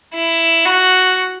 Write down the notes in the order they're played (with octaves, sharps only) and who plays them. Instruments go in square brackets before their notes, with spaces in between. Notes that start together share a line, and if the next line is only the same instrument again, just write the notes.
[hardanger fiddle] E4
F#4